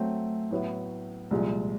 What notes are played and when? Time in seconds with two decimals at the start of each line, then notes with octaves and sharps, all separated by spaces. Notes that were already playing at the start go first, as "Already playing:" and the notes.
Already playing: F#3 A3 C4
0.51 A2 F#3 B3 E4
1.31 C2 A#2 F3 G#3